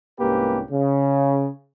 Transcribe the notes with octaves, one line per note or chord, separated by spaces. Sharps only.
C2 G#2 A#3 C#4 G4 B4
C#3